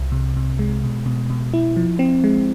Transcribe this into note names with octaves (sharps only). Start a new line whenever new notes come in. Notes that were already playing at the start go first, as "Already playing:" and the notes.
Already playing: C2
C3
C3
G#3
B2
B2
B2
E4
F3
C4
G#3